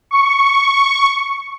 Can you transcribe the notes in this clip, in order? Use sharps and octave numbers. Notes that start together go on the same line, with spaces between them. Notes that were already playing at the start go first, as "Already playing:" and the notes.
C#6